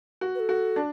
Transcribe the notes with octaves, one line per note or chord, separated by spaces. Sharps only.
F#4
B4
A4
F#4
D4